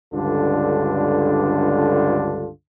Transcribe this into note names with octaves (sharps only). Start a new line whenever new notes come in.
C#2 G2 D3 D4 F4 A4